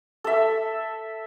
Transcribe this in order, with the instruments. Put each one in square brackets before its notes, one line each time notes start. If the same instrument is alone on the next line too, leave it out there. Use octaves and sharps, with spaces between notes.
[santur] A4 E5